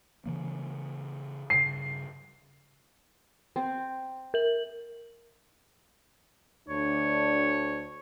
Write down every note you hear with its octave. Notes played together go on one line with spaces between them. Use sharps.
C#3 E3 A#3
G2 C#3 C7
C4
A#4 F#7
D2 D4 C#5